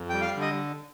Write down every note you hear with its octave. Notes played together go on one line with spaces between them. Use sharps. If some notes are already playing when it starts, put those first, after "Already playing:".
Already playing: F2
G3 G5
F5
D3
D#5